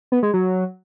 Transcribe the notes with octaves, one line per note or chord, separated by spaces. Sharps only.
B3
G#3
F#3